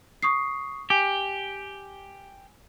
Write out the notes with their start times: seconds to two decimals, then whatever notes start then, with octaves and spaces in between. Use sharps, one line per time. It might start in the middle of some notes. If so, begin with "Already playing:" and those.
0.23 C#6 D#6 C7
0.90 G4 G#5